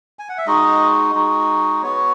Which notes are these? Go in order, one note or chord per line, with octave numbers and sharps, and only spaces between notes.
G#5
F#5
E5
G#3 D#4 F#4 D#5
G#3 D#4 F#4
B3 F#4 C#5